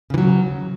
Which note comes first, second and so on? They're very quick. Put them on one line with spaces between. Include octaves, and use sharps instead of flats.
C#3 E3 F#3